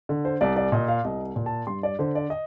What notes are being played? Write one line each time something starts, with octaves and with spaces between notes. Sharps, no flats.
D3
C5
C2 D5
D5
A#2 D#5
F5
C2 D#5
A#2
A5
G2 C6
D5
D3 C5
D5
D#5